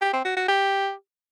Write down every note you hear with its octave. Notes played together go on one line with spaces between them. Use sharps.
G4
C4
F#4
F#4
G4